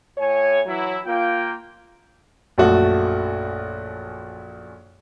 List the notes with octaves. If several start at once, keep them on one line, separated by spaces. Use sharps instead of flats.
A2 C#5 G#5
E3 F#3 E4
A#3 F4 G5
A#1 F#2 A3 F#4